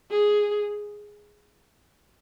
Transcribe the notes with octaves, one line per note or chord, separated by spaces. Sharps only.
G#4